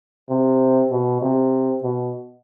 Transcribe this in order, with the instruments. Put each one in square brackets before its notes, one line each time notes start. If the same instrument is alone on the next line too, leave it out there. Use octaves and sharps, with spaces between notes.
[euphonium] C3
B2
C3
B2